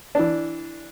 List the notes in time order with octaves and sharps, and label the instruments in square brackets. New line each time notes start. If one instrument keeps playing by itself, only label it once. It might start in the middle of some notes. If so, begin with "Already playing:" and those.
[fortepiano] E3 D4